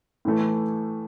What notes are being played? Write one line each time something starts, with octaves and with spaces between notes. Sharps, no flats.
A2 E3 A3